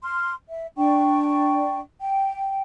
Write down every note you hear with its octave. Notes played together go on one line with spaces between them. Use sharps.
C6 F6
E5
D4 D5 G5 C#6
G5